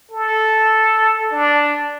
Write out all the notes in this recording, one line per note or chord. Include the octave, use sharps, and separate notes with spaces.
A4
D4